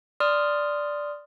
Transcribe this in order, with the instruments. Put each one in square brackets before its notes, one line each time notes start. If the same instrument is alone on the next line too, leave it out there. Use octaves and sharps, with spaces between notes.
[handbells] D5 C6 D#6 F6